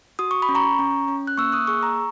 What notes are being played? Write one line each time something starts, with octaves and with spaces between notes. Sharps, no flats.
F#4 D#6
C#6
B5
C#4
A#5 C#6
C#4
C#4
F#6
A#3 C#6 E6
D#6 F#6
G#4 C#6 E6
A#5 C#6